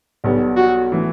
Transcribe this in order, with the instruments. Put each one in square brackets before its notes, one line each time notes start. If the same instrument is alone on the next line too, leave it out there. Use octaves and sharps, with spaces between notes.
[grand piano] B1 B2 G3 B3
[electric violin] F#4
[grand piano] E3 A3